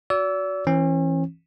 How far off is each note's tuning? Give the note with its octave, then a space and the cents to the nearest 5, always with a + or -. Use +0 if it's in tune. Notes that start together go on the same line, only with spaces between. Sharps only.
F#4 -5 D5 -40 E6 +0
E3 +0 C#4 -40